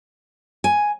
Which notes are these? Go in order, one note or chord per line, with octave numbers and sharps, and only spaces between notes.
G#5